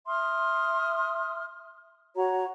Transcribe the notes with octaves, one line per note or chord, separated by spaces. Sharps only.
E5 C6 D#6 F6
F#4 C#5 A#5